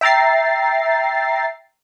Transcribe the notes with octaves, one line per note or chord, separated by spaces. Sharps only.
E5 G5 A#5 A6 C7